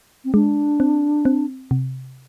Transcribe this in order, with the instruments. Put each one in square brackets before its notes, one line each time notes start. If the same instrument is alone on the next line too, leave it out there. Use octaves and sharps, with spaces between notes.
[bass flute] C4
[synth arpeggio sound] G#3 [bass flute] D4
[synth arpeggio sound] C4
C4
C3